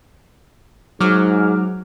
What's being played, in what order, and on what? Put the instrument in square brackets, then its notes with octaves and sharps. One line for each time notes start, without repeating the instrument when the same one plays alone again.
[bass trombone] G#2 [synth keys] F#3 D6 F6